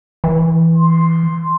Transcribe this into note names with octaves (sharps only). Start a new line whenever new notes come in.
E3
C6